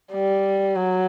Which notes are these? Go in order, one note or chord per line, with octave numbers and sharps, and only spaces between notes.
G3
F#3